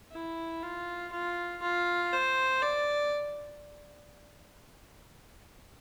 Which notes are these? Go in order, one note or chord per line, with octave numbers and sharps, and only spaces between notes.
E4
F4
F4
F4
C5
D5